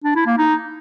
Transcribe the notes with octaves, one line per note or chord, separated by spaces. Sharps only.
D4
E4
A#3
D#4